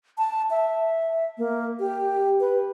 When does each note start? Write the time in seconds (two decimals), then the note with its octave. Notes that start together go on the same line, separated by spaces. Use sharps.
0.18 A5
0.50 E5
1.38 A#3
1.79 G4
2.40 B4